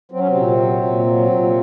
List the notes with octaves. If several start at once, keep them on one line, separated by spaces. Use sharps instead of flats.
F#3 C4
C#4
C3 C4
A#2
F#3
A#2
F#3
A#2